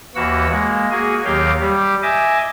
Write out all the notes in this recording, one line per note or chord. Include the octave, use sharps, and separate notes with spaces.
D#2 E3 A#3 F#4 F#5 E6
G#3 A#3
A#3 F#4 G#4 G#5
D#2 D#3 F#3 G4 F5 G5
G3 G4
D#5 E5 G#5 D6